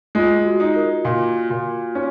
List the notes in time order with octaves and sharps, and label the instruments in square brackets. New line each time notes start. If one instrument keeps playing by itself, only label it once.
[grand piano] G#3 [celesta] F4
[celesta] F#4
[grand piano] D#4
[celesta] A#4
[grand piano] A#2
A#2
C#4